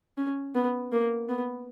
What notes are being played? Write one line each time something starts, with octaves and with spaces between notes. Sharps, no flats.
C#4
B3
A#3
B3